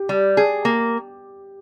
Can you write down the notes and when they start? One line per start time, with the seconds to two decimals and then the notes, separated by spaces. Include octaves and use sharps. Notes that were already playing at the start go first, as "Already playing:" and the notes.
Already playing: G4
0.09 G3
0.37 G#4
0.65 A#3